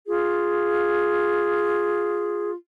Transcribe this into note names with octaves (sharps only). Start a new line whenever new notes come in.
F4 G#4